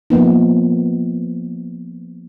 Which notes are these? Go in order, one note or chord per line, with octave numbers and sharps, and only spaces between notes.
F3 A#3 B3 D#4